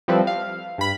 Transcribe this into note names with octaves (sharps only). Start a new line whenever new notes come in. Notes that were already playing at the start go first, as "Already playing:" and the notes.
F3 G3 C4 E4 A4 B4
F5
G2 B5